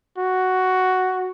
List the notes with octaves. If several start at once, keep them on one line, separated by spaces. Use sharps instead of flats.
F#4